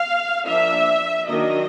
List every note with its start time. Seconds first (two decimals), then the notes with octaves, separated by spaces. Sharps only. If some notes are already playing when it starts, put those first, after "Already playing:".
Already playing: F5
0.47 F3 A#3 D4 E5
1.28 D#3 F#3 A#3 D4 D#5